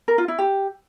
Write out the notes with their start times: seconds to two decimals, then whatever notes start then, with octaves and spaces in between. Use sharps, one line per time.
0.08 A#4
0.18 F4
0.28 E4
0.39 G4